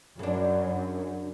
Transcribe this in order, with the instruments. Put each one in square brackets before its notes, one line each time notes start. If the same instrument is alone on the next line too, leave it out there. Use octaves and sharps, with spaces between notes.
[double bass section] F#2 [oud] C#3 D4